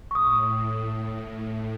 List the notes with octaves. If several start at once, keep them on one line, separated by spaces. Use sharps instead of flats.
A2 C#6 D#6